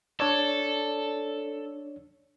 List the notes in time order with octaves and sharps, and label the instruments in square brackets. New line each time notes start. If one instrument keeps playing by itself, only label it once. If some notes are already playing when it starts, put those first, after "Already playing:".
[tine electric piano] D4 C#5 D5 [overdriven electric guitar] A4